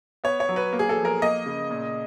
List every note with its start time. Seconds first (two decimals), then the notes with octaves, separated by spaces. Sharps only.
0.24 B3 C#5
0.40 C#5
0.49 F#3
0.56 B4
0.73 A#3
0.79 G#4
0.89 A4
0.97 F3
1.05 A#4
1.22 A#3 D#5
1.46 C#3
1.70 A#2